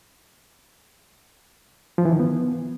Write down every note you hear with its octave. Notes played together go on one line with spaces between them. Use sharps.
F3
E3
D#3
B3